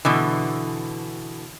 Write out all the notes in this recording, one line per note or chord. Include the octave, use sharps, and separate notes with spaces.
B2 D3 E3